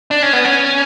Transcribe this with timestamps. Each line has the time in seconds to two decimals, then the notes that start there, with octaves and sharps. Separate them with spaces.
0.11 D4
0.23 C#4
0.33 B3
0.45 C#4